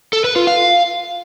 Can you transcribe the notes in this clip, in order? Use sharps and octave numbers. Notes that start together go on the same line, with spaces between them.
A4
B4
F4
F5